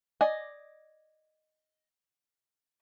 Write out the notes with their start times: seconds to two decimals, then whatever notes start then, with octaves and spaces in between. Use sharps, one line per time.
0.21 D5 D#5 G#5